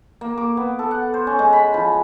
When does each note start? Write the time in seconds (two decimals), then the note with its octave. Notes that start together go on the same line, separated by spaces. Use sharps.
0.21 A#3
0.38 D6
0.57 B3
0.79 A4
0.91 F#5
1.14 C5
1.27 C#4
1.39 G#3
1.53 B5
1.74 F3